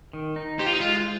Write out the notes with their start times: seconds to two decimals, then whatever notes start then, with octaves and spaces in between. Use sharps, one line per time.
0.13 D#3
0.36 D#4
0.59 G4 C5
0.66 F4
0.73 D#4
0.80 G#3 F4